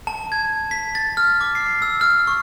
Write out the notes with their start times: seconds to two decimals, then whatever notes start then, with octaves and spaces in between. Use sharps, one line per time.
0.07 A5
0.32 G#6
0.71 B6
0.95 A6
1.17 F6
1.41 D6
1.55 C7
1.82 E6
2.01 F6
2.27 C#6